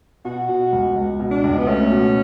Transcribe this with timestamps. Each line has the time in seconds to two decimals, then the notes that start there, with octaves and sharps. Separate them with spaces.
0.25 B2 F#4
0.49 B2
0.72 C#2
0.96 C#2
1.20 B2
1.31 D4
1.44 C#2
1.58 B3
1.67 A3 C#4
1.92 B2